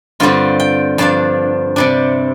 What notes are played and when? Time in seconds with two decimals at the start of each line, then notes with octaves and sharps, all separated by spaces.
0.20 G2 D3 G3 C4 F4
0.60 G5
0.98 G2 F3 D4 A5
1.76 C3 G3 D4